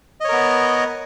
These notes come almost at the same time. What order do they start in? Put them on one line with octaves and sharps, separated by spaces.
D#5 C#5 A#4 B3